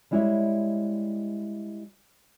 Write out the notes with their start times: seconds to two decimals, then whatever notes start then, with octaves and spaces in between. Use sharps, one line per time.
0.11 G3 G#3 E4 G4 C#5 E5